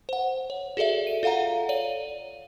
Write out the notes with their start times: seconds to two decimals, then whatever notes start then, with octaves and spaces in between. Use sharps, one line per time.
0.09 C5 F#5
0.50 C#5
0.77 F#4 G#4 A4 D5 E5
1.07 D#7
1.23 F4 A4 F5 F#5 A#5
1.69 C#5 D5 D#7